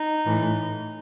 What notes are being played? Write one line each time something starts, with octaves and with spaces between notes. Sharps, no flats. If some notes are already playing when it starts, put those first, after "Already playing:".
Already playing: D#4
A2 E3